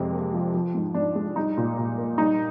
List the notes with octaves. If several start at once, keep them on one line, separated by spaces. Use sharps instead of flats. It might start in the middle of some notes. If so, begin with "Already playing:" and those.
Already playing: F2 C3 G#3
A#3
F3
F3
G#2
G#2 D4
G#3
G3 D#4
A#2
A#2
A#3
G3 D#4